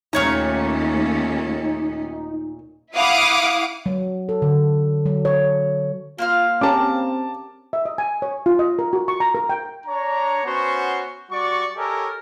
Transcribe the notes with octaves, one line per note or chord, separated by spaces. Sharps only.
D#2 A#2 A3 C#4 D#4 C#5 A#5
E4 F5 F#5 D6 D#6
F#3
A4
D3
F#3
C#5
A#3 F4 C5 F5
C4 C#4 G4 A#4 A5 D6
E5
D#5
G#5
C#5
F4
D#5
A#4
F#4
C#6
A#5
A#4
G5
D4 C#5 A#5
B3 C#4 F#4 C5 C#6
G3 F#4 D5 C#6
G4 A4 A#4 C#5 D#5 G#5